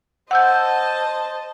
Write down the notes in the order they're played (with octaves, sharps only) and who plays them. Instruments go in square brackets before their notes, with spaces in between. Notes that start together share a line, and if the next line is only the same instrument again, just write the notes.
[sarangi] C5 [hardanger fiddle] D#5 A5 [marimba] F#5 E6 G6